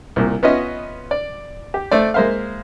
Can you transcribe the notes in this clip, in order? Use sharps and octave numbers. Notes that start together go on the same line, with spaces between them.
C2 A#2
B3 C#4 F4 D#5 E5
D5
G4
A3 C5 D5
G#3 A#3 C5 E5 F5